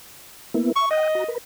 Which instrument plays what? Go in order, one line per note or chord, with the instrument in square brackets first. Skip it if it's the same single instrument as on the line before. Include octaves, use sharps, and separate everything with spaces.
[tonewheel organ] A#3 B3 E4
[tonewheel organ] E5 [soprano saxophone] C#6
[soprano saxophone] D#5 [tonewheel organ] F#5 G5 D#6
[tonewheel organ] F#4 A#5
A#4 B4